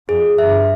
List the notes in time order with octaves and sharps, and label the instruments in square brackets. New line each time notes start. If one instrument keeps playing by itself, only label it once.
[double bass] F2 [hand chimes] G#4
[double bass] G2 [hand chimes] E5